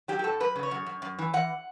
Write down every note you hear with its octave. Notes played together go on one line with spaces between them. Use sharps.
F#3 G4
G4
A2 A4
F#2 B4
C#3
C#5
F#2
F#2
F#2
E3
E3 F#5